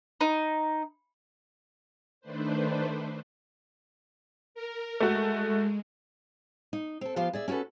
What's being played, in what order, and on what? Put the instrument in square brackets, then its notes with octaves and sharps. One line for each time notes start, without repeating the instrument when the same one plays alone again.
[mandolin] D#4
[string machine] D#3 A3 D4 B4 C5
A#4
[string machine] G#3 [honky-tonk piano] A3 F#4
[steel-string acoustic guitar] D#4
C4 A4
F3 B3 F4 G4 C5
G#4 D5 E5
C#4 F#4 G#4 A4 B4